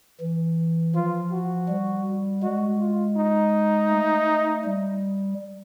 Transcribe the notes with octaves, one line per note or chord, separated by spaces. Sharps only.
E3
F3 F4
F#4
G3
G#3 F#4
F4
D#4
A3
G3